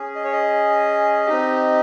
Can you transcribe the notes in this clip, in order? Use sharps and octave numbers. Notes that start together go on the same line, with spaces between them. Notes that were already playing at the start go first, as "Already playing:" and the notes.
Already playing: C#4 G#4
D#5
C#5
D#5
C4 D#4 G4